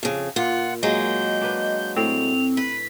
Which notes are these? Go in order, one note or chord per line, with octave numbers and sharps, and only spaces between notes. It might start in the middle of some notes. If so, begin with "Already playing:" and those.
F2 C#3
A#2 F4 F#5
F#3 G#3 A#3 D#5 G6
D4 B4
A2 C4 C5 F7
B4 B6